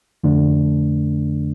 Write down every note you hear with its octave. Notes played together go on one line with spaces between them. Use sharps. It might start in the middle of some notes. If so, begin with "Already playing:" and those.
F2 D3 A3 D4